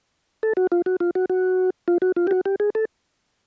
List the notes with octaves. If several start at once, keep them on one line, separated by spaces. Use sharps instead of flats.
A4
F#4
F4
F#4
F4
F#4
F#4
F4
F#4
F4
G4
F#4
G4
G#4
A4